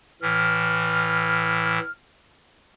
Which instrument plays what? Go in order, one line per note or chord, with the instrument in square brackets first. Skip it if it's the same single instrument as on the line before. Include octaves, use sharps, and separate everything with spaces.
[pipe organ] A2 E3 [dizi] F6